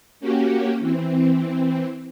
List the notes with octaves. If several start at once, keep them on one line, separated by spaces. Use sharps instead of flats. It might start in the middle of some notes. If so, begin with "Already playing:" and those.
A#3 C#4 F#4 G4
E3 C4